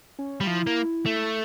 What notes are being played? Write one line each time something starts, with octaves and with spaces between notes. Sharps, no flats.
C#4
G3
F4
F3 E4
A#3
A3